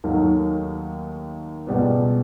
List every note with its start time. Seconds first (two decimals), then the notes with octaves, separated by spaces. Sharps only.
0.04 D#2 D#3 F#3 A3
1.67 C#2 B2 G3 B3